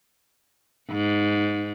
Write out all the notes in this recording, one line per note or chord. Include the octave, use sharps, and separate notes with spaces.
G#2